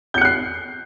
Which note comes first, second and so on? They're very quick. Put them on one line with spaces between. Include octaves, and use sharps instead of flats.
G6 C#7 F#6 C7